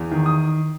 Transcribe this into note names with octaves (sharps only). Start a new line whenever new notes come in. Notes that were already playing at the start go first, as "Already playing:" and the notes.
Already playing: E2
D#3
D#6